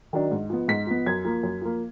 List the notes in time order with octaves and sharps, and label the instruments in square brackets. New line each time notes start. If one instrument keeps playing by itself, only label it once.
[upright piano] D#3 F#3 D4
G#2
F3 B3
G#2 B6
F3 B3
F#2 G#6
F3 A#3
F#2
F3 A#3